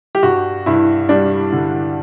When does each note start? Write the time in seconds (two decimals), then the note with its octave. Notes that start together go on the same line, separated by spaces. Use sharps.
0.15 G4
0.23 G2 F#4
0.66 G2 E4
1.09 G3 D4
1.52 D3